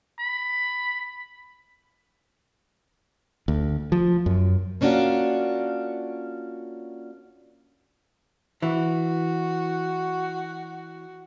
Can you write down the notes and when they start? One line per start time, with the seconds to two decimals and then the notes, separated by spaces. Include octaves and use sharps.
0.19 B5
3.48 D2
3.92 F3
4.26 F#2
4.81 A#3 C#4 D4 F4 F#4
8.62 E3 F#4